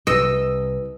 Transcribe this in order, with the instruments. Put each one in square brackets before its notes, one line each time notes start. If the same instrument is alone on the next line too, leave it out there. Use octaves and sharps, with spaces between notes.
[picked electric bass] C2 [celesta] B4 [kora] D#5 [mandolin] E6